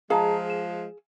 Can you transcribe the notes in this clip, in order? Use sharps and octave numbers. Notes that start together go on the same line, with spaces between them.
F3 G#3 G#4 F5 A5 A#5 F6
E7